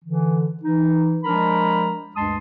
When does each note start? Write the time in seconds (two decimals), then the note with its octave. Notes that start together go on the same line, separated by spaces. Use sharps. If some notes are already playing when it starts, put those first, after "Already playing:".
0.05 D3 E3
0.63 E3 D#4
1.24 F3 G#3 D4 A#4 A#5 B5
2.16 D2 G2 G#3 A5 C6 D#6